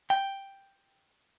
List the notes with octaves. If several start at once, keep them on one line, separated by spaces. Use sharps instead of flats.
G5